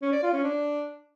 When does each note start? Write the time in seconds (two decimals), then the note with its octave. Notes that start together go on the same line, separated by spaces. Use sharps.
0.02 C#4
0.13 D5
0.23 F4
0.33 C#4
0.44 D4